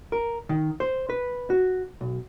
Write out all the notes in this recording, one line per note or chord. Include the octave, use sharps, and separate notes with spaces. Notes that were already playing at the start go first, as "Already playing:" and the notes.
A#4
D#3
C5
B4
F#4
B1